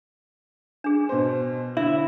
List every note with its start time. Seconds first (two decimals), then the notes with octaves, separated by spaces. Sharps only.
0.84 D4 G#4
1.09 B2 C5
1.77 D3 E4 E5